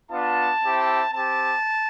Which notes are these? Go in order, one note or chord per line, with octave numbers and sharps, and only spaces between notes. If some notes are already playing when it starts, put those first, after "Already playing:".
B3 D4 F4 A5
C4 E4 G4
C4 G4 A5